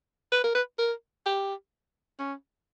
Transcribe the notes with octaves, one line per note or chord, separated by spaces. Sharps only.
B4
A#4
B4
A#4
G4
C#4